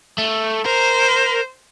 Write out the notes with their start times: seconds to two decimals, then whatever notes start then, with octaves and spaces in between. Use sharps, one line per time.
0.18 A3
0.66 A#4 C5